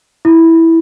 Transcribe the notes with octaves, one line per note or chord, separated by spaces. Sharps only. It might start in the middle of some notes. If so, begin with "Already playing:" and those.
E4